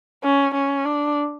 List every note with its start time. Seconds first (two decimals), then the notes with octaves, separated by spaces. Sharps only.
0.24 C#4
0.55 C#4
0.85 D4